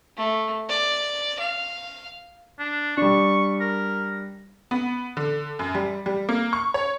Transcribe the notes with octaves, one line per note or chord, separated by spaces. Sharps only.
A3
D5
F5
D4
G3 D4 C#6
A#4
B3
D3
F#2
G3
G3
A#3
C#6
C#5